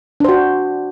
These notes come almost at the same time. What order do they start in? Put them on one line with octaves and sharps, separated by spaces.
D4 C5 F#4